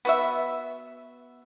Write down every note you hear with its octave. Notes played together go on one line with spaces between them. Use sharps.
B3 F#4 E5